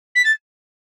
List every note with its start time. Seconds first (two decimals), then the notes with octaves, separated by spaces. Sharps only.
0.15 B6
0.24 A6